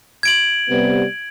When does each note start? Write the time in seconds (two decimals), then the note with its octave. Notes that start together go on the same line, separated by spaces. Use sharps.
0.23 G#6 D7 F#7
0.69 C3 G3 B3